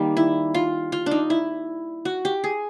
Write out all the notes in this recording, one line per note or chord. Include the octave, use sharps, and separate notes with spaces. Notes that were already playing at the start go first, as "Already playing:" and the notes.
Already playing: D#3 G3 A#3
E4
F4
F4
D4
D#4
E4
F#4
G4
G#4